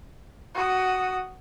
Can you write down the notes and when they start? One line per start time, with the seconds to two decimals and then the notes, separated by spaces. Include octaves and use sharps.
0.54 F#4 D#6